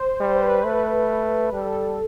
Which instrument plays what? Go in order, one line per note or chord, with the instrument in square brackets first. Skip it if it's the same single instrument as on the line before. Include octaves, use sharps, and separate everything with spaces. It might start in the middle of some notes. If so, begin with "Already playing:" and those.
Already playing: [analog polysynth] C5
[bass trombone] G3 [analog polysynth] C5
[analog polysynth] B4
B4
[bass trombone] A3 [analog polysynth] B4
[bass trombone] G3 [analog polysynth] A4